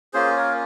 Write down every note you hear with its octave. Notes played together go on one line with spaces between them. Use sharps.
A#3 C#4 F4 G#4 C5
A#4 C#5